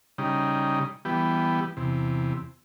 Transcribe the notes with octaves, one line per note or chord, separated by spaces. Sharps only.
C#3 G3 D#4
E3 G3 B3 G4
E2 C3